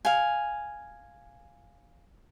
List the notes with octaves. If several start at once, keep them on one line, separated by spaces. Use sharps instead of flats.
F5 G#5